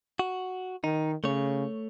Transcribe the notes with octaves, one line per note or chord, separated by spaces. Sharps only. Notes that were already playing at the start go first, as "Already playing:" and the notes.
F#4
D#3 D#4
C#3 A3 C#5